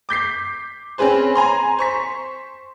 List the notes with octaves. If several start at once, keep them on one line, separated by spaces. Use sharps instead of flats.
D6 G6 B6 C7
C4 C#4 G#4 B4 C5
G#5 A#5 C6
C5 C#6 B6